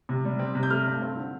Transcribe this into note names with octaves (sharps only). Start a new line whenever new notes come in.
C3
G3
C4
C3
G6
A3 F6
G2
C4
D3